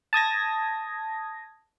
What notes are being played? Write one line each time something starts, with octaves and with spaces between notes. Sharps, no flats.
A5 D#6 G#6 A#6